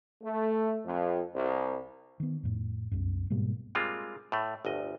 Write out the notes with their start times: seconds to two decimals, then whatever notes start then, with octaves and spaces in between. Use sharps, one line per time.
0.22 A3
0.85 F2
1.34 C2
2.20 D#3 B3
2.43 F2 A2
2.91 C2 F#2
3.30 G#2 B2 G3 A#3
3.75 G3 G#3 A#3 C4 F4
4.32 A2 A3
4.65 G1 D2 D#5